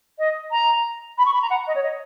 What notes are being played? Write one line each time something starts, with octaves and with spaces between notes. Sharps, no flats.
D#5
A#5
B5
C#6
B5
A#5
F#5
D#5
C#5
D#5